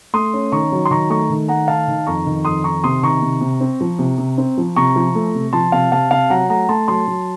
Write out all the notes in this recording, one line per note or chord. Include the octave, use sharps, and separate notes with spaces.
A3 C6 D#6
C#4
D#3 A#5 C#6
F#3
C6
D#3 A#5 C#6
A3 A#5 C#6
D#3
A3 F#5 A#5
D#3 F5 A5
D#3
F2 A#5 C#6
D#3
F2 C6 D#6
D#3 A#5 C#6
C3 C6 D#6
D#3 A#5 C#6
C3
C3
C4
F3
C3
C3
C4
F3
C3 A#5 C#6
F3
A3
C3
F3 A5 C6
C3 F5 A5
C3 F5 A5
C3 F5 A5
F#3 F#5 A#5
A3 F#5 A#5
A3 A5 C6
F#3 A5 C6
F#3